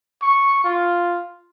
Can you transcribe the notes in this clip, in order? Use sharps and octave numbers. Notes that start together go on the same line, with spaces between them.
C#6
F4